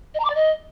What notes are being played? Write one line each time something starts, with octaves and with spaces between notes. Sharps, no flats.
D#5
A#5
D6
D5
D#5